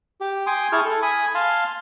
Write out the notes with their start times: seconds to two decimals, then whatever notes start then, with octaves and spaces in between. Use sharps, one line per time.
0.21 G4
0.47 G5 G#5 C6 D#6
0.72 E4 G#4 A5 C#6 F6
0.85 A4
1.02 G#5 B5 D#6
1.35 F5 A5 C6